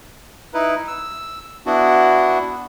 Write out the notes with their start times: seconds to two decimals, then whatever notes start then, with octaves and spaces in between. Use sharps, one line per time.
0.54 D#4 E4 B4
0.87 E6
1.66 B3 D4 E4 F#4